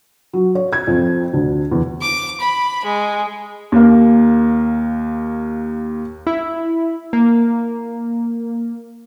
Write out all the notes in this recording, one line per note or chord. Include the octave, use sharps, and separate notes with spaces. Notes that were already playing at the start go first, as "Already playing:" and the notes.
F#3
C#5
G#6
F2
D2
E2
D6
B5
G#3
D#2 A#3
E4
A#3